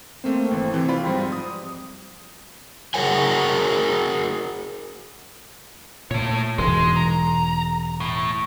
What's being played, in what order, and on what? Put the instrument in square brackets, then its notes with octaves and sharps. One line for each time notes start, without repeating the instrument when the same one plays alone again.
[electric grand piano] A3 A#3 C5 [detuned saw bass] C4
[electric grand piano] G#1 E3
C3 E3 A3
F4 D5 B5
G#2 F3 G3
D#6
[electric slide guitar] F#4 G#4 A#4 C#5 F#5 G#5
[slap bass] A#2 [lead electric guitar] A3 C#5
[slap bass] E1 G#2 E3 [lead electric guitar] G#3
[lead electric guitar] A#5
A2